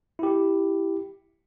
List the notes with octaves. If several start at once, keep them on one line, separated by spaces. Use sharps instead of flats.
E4 G4